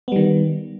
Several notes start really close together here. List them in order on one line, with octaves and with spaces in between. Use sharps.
B3 G3 D#3